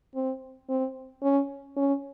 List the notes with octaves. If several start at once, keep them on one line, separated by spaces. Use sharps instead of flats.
C4
C4
C#4
C#4